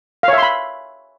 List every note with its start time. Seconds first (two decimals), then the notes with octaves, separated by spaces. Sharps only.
0.23 F5
0.28 C#5
0.33 E5
0.38 C6
0.43 B5